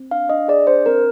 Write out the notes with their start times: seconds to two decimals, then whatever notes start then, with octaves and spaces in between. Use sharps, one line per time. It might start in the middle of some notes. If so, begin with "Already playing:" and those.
Already playing: C4
0.11 D4 F5
0.29 D4 D#5
0.48 G#4 D5
0.67 D4 C5
0.86 C4 A#4